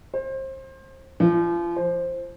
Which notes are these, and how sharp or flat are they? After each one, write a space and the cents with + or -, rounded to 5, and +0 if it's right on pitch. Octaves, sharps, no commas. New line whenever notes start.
C5 +30
F3 -35
C5 +10